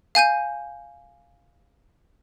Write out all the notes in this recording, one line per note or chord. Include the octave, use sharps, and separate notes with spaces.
F5 G#5 G6 D#7